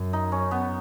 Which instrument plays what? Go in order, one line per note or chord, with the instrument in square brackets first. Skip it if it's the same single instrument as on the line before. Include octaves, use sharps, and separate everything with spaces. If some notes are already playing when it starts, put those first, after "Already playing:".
Already playing: [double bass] F#2
[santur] D#4
C#4
B3